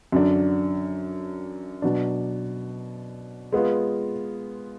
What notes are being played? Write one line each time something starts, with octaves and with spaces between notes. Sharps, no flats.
F#2 D3 F#3 D4
B2 F#3 D4
G#3 B3 F4